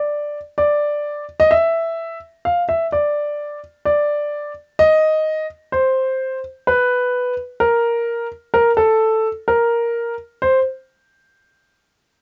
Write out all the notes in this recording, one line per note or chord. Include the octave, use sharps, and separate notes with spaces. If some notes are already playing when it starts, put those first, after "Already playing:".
Already playing: D5
D5
D#5
E5
F5
E5
D5
D5
D#5
C5
B4
A#4
A#4
A4
A#4
C5